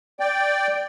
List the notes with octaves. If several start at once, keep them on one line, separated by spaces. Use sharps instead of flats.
D5 G5